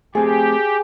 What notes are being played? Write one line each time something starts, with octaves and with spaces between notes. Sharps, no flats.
A3 C4 G4 G#4